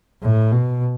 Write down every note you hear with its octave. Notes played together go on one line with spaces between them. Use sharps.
A2
B2